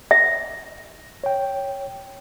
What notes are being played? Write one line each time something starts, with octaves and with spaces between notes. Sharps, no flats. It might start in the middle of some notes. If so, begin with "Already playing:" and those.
E5
C#5 G5